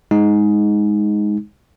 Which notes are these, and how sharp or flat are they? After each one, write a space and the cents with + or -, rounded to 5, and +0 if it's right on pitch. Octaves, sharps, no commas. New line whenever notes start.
G#3 +0 D#4 +10